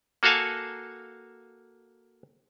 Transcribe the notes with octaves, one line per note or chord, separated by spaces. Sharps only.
A#3 F#4 A4 F5 G#5 A5